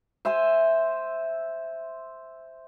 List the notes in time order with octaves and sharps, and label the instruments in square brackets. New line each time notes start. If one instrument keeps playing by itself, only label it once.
[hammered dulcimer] C5 E5 G#5 C6